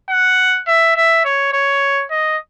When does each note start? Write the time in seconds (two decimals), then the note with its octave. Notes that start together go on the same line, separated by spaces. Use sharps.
0.10 F#5
0.67 E5
0.96 E5
1.25 C#5
1.53 C#5
2.11 D#5